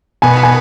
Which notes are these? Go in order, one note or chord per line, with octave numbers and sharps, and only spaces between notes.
B2 G#5
G#5